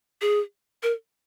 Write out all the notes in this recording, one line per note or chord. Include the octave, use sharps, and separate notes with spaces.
G#4
A#4